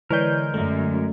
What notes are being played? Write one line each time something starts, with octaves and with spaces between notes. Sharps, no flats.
D3 E3 G#3 A#4 C#5 D5 G6
F#2 A3